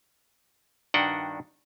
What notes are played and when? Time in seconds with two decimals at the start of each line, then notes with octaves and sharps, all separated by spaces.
0.94 G2 D#3 D4 F#4 F#5 G5